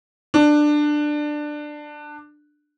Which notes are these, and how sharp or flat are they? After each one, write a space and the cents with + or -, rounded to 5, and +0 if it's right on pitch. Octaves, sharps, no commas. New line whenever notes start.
D4 +15